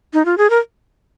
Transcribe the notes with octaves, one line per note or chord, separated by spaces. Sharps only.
D#4
F4
G#4
A#4